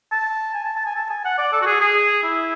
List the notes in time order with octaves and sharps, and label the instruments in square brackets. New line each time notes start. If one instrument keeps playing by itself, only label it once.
[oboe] A5
G#5
A5
A5
G#5
A5
G#5
F#5
D5
A4
F#4
G#4
G#4
E4